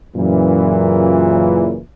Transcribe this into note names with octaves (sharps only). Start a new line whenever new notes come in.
F#2 A#2 C#3 E3